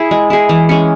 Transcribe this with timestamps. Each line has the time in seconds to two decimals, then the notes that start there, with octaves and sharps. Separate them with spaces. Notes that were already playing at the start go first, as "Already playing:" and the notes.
Already playing: E4 G#4
0.11 G#3
0.30 E4 G#4
0.49 E3
0.69 G#3 C#4